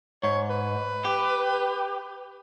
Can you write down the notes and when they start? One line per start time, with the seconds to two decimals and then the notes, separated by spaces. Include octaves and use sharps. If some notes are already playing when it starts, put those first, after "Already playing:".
0.23 G#2 C#5
0.50 B4
1.05 G4